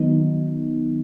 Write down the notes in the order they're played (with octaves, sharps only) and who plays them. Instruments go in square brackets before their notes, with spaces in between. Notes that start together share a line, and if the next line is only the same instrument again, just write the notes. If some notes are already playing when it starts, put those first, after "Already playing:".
Already playing: [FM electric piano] D#3 F#3 B3 D#4